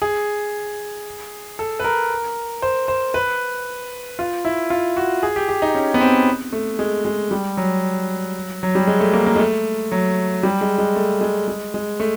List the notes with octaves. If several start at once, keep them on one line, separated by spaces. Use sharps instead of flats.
G#4
A4
B4
A#4
C5
C5
B4
F4
E4
F4
F#4
G#4
G4
G4
D#4
C#4
B3
C4
A3
G#3
G#3
G3
F#3
F#3
G3
G#3
A3
A#3
A#3
G#3
A3
F#3
G3
G#3
G#3
A3
G#3
G#3
G#3
A3